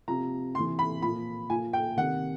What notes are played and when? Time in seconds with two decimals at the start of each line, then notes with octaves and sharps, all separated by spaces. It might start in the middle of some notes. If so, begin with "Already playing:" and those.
0.08 C3 F3 A#5
0.55 C3 C6
0.59 E3
0.79 B5
1.02 A#2 F3 B5
1.50 A#2 F3 G#5
1.73 G5
1.97 C3 D#3 F#5